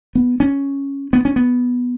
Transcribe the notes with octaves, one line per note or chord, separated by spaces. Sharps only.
B3
C#4
B3
C#4
B3